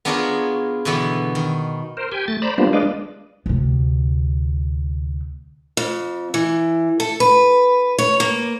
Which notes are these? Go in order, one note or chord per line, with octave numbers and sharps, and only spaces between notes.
B3 D4 F4 G#4 A#4 C#5
B2 D3 E3 B3 B5
D#3
A#4 C5
G4 G5 G#5
A3 A6
C5 D5 A#5 B5
G3 A#3 B3 D4 F4 C5
G#3 D4 B4 D5 D#5 F5
D2 C3
F2
E3
A4
B4
C#5
A#3